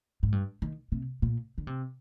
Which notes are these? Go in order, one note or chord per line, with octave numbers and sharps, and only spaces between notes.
G#2
G2
D#3
C3
A#2
D3
C3